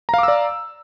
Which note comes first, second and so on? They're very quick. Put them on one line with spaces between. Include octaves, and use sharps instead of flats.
A#5 F5 D6 E6 D5